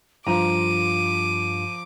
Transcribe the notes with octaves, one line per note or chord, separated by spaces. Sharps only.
G2 F3 F4 A#5 D6 D#7